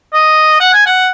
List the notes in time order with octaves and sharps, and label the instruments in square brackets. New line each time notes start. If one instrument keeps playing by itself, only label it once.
[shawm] D#5
F#5
G#5
F#5